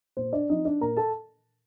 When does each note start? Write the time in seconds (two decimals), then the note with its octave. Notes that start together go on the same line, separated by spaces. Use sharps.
0.17 A#2 C5
0.33 D4 D5
0.50 F3 C4 D#4 D#5
0.65 D4 D5
0.81 A#2 A#4 A#5
0.97 A4 A5